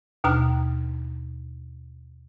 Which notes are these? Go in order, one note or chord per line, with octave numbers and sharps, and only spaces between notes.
D#2 B2 D4 A#5 F6